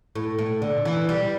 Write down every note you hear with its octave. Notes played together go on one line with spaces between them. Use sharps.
A2
A2
D3
E3
G3